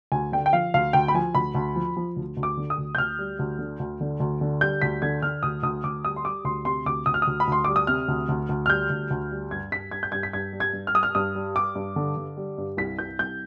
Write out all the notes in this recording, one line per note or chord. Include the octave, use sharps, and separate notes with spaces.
D2 G#5
D3 G5
G5
F3 F5
D2 F5
D2 G5
B5
F3 G#5
D2 B5
D2
F3
F3
D2
D2
D6
D3
D#6
D2
G6
D2 F6
G3
D2
D3
D2
D3
D2
D3
G3 G6
D2 B6
D3 G#6
D3 F6
D2 D#6
D2 D#6
D2 D6
G3 D#6
C6
G3 D6
D2 C6
C3 C6
D2 D6
D2 D#6
F6
D#6
D2
B5
D2 C6
G3 D6
D#6
C3 F6
D2
D2
D2
F6
G3 G6
D2
D2
G3
G2 G#6
G2 B6
G2 G#6
G6
G2 G#6
B6
G2 G#6
G3
G#6
G2
F6
G3 D#6
F6
G2 D#6
G3
G3 D6
G2
D3
D3
G3
G2
C2 B6
C2 G6
C2 G6